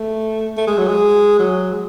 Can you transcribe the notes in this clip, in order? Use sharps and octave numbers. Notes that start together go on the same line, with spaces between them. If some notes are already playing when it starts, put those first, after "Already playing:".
Already playing: A3
A3
G#3
F#3
G#3
F#3
G#3